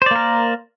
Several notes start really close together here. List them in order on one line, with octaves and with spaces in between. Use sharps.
C5 D5 A#3 A#4